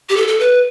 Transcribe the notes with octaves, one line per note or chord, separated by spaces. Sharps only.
G4
A4
A4
B4